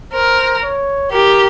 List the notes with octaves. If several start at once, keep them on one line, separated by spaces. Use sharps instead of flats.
A#4 C5
C#5
G4 A#4